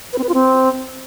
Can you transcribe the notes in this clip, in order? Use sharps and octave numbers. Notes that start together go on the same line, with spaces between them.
B4
C4
B4
F4
C4